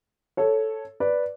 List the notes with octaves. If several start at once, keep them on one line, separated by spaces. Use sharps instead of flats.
A4 C#5
B4 D5